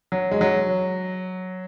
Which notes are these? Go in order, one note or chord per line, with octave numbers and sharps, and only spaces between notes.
F#3
G#3
F#3